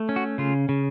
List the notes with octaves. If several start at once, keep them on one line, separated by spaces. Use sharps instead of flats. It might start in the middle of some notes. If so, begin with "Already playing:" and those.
Already playing: A3
C#4
F#4
C#3 F4
C#3